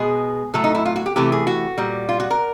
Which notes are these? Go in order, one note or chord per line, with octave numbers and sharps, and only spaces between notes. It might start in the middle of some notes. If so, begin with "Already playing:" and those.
Already playing: B2 G#3 G#4
A2 F#3 A3 A4
D#4
E4
F4
F#4
G4
C3 E3 A3 G4
G#4
F#4
A#2 G3
F4
F#4
A#4